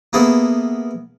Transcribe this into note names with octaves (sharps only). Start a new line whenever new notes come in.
A#3 B3 E4 G#4 A4